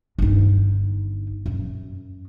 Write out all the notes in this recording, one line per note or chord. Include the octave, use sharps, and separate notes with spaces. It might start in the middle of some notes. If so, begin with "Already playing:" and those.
G1 D#4
F#2